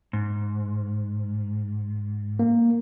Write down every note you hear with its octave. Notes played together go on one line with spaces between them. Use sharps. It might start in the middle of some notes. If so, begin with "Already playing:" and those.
G#2
A#3